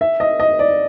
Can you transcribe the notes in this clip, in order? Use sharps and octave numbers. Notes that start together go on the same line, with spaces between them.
E5
D#5
D#5
D5